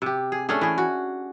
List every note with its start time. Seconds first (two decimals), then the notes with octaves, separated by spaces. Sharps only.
0.02 C3 G4
0.32 G#4
0.49 A3 C#4 D4 G#4
0.61 E3 G#4
0.78 F#4